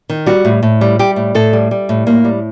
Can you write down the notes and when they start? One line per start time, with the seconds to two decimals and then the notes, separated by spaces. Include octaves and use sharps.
0.09 D#3
0.26 G3 F#4
0.45 A2
0.63 A2
0.81 G3
0.99 G3 G4
1.16 A2
1.35 A2 A4
1.53 G3
1.71 G3
1.89 A2
2.07 A2 A#3
2.25 G3